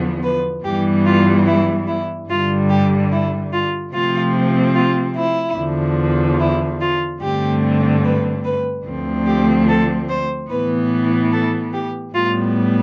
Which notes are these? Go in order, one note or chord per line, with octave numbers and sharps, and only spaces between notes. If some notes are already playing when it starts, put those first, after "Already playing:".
Already playing: E2 D3 F3 B3
B4
G2 E3 G3 B3 G4
F4
E4
E4
G2 D3 G3 F4
G4
E4
F4
C3 F3 A3 C4 F4
F4
E4
E2 D3 F3
E4
F4
G2 D3 A3 C4 G4
B4
B4
D2 D3 F3 A3 C4
G4
A4
C5
A2 E3 B3 B4
A4
G4
A2 G3 B3 F4